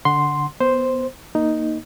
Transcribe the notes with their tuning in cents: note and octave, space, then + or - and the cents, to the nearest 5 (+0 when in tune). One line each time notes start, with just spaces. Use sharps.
D3 -10 F#5 +0 C6 +0
B3 +0 C5 +0
A#3 +0 D#4 +0